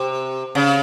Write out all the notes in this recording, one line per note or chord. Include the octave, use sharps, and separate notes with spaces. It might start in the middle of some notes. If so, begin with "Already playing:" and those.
Already playing: C3
C#3